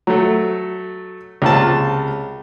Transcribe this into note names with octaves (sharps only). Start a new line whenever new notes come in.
F#3 A3
C#2 C3 A#3 F4 A5